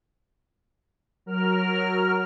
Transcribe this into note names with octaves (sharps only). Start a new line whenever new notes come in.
F#3 A#4 F6